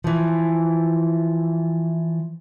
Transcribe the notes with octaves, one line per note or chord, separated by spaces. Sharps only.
E3 F3